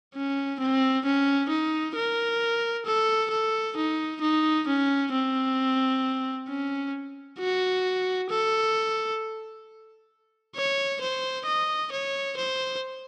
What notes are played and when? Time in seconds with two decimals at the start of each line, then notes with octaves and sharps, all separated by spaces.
0.14 C#4
0.60 C4
1.05 C#4
1.49 D#4
1.95 A#4
2.86 A4
3.31 A4
3.77 D#4
4.21 D#4
4.67 C#4
5.12 C4
6.49 C#4
7.39 F#4
8.30 A4
10.56 C#5
11.01 C5
11.46 D#5
11.92 C#5
12.37 C5